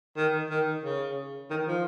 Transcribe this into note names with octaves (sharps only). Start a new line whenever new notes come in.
D#3
D#3
C#3
D#3
F3